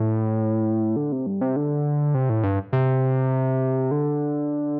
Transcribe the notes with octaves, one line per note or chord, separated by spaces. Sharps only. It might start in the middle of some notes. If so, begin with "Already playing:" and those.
Already playing: A2
D3
C3
G2
C3
D3
C3
A2
G2
C3
D3